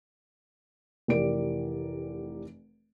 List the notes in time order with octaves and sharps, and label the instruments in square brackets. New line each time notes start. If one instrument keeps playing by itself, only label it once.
[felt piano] F1 E3 G4 A#4 D5 D7